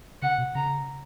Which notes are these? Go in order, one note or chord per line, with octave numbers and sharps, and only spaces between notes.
C#3 F#5
B2
C#3 A#5